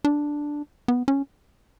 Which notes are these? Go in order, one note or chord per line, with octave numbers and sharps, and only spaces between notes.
D4
B3
C#4